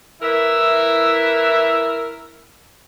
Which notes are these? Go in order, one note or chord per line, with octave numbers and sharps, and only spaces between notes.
E3 E4 A#4 E5